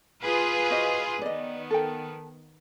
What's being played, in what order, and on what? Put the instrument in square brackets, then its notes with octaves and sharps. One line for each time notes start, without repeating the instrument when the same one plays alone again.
[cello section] F4 G#4 B4
[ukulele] F#4 C5 D#5
[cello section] D#3 B3 [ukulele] D5 D#5
[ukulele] A4 A#4 G5